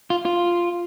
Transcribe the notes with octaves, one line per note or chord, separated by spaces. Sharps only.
F4
F4